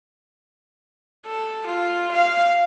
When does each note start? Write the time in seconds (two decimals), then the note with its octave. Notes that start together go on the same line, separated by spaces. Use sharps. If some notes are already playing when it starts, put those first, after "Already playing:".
1.26 A4
1.66 F4
2.12 F5